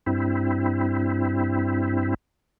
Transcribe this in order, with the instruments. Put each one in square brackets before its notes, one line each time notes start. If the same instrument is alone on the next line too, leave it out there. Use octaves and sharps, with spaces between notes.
[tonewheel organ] G2 C4 E4